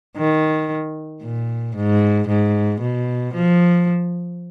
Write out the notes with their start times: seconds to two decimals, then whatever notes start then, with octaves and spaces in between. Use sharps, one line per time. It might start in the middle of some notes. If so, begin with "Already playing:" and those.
0.17 D#3
1.23 A#2
1.76 G#2
2.28 G#2
2.81 B2
3.34 F3